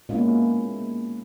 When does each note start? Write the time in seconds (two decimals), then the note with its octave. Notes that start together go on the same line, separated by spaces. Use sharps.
0.09 A#2 G#3 A#3 B3 C#4 E4